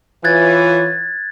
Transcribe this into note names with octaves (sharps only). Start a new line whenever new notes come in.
E3 F4 C#5 F#6 G#6 A6